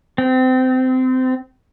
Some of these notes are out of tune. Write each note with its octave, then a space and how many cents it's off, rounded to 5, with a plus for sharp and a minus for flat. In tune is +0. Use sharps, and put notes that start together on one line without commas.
C4 -25